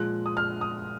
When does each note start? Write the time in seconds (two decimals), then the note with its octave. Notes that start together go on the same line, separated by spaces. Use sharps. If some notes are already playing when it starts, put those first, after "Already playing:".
Already playing: A#2 F3 G#3 F#6
0.26 D#6
0.37 F6
0.61 D#6